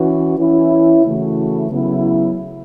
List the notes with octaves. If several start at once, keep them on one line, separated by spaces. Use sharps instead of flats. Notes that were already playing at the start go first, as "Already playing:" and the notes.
Already playing: E3 C#4 F#4
E3 C#4 E4
C#3 E3 A3 F#4
C#3 F#3 B3 E4